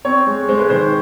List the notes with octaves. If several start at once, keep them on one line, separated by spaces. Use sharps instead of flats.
C4 C#5
G#3
G#3 C5
B4
D#3 C5